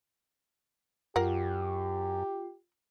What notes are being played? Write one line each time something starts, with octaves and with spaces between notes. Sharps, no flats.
F#2 F4 G4 A#4 F#5